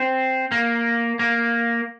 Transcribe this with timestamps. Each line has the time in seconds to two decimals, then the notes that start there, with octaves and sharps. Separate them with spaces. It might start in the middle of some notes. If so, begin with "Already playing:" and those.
Already playing: C4
0.52 A#3
1.19 A#3